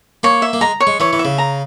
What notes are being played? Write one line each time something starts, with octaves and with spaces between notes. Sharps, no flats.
A#3 C#5
E5
A#3
G#3 A#5
C#5
G#3
E3 C#5
E3
E5
C#3
A#5